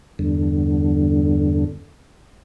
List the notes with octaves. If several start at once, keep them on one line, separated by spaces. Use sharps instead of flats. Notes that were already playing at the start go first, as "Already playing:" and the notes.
E2 G2 D3